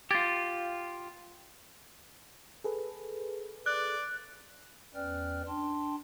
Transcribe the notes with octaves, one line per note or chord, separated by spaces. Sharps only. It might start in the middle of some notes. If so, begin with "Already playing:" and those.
F4 G4 G#6 A6
G#4 A4 B4
D5 F#6
E2 C#4 B4 D5 G5 F6
D4 G5 A5 C6